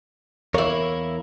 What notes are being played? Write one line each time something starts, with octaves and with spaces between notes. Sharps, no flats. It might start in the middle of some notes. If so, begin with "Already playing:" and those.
E2 A#3 E4 A#4 C#5